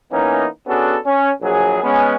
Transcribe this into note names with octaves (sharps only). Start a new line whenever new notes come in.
E3 A#3 B3 C#4 D#4
B3 C#4 D4 F#4 G#4 A4
C#4
A#1 F#3 G#4
G#3 B3 C#4